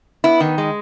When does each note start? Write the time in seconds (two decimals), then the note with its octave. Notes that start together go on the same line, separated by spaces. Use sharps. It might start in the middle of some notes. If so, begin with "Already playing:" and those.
0.24 B3 E4
0.40 D#3
0.58 G#3